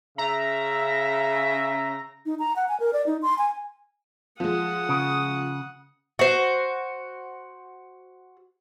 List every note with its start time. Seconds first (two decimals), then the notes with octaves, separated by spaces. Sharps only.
0.18 C#3 E5 A#5
2.26 D#4
2.39 A#5
2.56 F#5
2.68 G#5
2.80 A#4
2.93 D5
3.07 D#4
3.22 C6
3.38 G#5
4.40 F3 G#3 F#5 D#6
4.89 C#3
6.19 F#4 C5